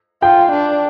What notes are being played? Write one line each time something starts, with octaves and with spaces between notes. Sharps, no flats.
F4 G5
D4